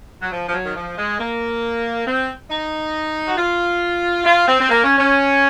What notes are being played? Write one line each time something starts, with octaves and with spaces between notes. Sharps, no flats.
F#3
F3
F3
F#3
D#3
F3
G#3
A#3
C4
D#4
F#4
F4
F4
C4
C4
A#3
C#4
C#4